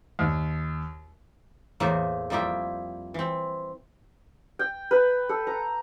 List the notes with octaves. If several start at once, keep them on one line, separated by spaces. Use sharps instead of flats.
D#2
E2 A2 E3 A#3 C5
F2 G3 A#3 E4 G5
E3 C4
G5
B4
A4
A#5